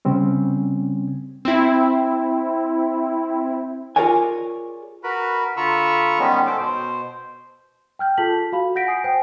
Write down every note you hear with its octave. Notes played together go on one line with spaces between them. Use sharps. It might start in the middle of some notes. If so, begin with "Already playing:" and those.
C#3 G3 C4 C#4
C4 E4
F4 G#4 A#4 C#5 D5 G#5
F#4 A#4 B4 B5
D3 F4 A#5 B5 C#6 E6
D#3 G3 G#3 B3 C#4
A4 C5 D6
B2 C5
G5 F6 G6
F4 G#4 A4 A5 B6 F#7
F#4 F5 B5
F#5 G6 A#6 B6 D7
G#5 D#6 C7
C5 G5 G#5